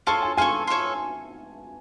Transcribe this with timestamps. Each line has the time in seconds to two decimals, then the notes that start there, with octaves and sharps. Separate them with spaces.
0.07 F4 A4 C#5 A5
0.22 G#5
0.37 F4 A4 C#5 G#5
0.68 F4 A4 C#5